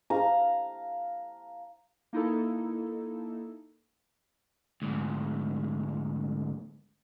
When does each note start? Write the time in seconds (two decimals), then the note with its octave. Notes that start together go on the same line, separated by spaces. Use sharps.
0.10 F5 A#5
2.13 A#3 D#4 E4 A4
4.82 D2 G#2